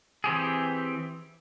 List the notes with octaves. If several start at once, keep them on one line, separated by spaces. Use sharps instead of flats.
E3 C4 G4 G#4